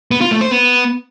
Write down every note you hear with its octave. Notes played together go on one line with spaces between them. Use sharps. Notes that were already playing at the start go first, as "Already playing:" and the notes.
B3
F4
A3
C5
B3